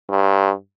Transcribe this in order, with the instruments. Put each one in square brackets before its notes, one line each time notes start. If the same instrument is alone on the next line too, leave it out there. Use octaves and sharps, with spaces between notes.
[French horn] G2